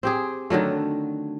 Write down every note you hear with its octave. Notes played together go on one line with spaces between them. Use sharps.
C4 G4 G#4
D3 D#3 F#3 A3